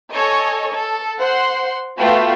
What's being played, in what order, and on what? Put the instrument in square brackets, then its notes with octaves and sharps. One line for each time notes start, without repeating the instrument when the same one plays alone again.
[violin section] A4 C#5 D#5 G#5 C#6
A4
C5 F#5 C6
A3 B3 F4 F#4 G5